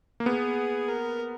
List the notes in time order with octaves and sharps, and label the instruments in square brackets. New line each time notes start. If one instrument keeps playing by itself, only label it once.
[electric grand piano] A#3
[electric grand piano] B3 [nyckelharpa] G#4
[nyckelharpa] A#4